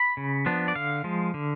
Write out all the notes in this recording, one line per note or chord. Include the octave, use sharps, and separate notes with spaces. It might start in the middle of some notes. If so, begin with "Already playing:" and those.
Already playing: B5
C#3
F3 B3 D4
D5
D3 F5
F3 G#3
D3